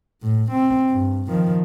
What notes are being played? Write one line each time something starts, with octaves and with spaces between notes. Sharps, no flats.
A2
C4
G2
D#3 F3